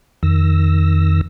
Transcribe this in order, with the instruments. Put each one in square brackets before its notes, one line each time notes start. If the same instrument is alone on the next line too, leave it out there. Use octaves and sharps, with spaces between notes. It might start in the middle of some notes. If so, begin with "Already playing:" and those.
[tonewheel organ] F2 D#3 E6 A#6